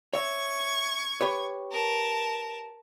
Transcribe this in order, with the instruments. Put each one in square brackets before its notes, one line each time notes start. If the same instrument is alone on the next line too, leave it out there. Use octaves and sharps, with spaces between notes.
[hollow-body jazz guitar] C#5 E5 [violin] C#6 G#6
[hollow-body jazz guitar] G4 B4 C#5
[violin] A#4 A5